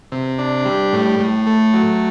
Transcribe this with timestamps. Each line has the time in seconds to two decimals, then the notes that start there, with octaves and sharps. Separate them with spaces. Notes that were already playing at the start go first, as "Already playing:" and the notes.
0.12 C3
0.38 D4
0.65 G3
0.93 A2
1.20 A2
1.47 A3
1.73 F#3